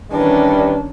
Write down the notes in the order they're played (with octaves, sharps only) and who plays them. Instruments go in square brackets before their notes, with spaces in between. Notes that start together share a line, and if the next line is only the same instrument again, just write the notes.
[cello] D#3 C#4 [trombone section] E3 G3 [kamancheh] D4 [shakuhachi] B4